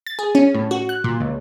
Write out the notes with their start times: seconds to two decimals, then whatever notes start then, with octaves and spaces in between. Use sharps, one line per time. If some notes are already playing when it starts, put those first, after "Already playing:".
0.06 A6
0.19 G#4
0.35 C#4
0.55 A2
0.71 F#4
0.89 F#6
1.04 A#2
1.20 C#2